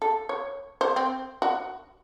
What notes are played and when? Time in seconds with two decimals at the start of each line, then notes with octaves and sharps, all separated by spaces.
0.02 A4
0.29 C#5
0.81 C5
0.96 C4
1.42 F#4